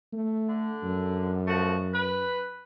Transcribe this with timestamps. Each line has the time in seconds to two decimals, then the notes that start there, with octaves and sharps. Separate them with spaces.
0.13 A3
0.48 D3
0.83 F#2
1.47 F3 A3 F#4
1.94 B4